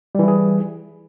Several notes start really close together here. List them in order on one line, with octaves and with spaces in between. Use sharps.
G3 E3 E4 G#4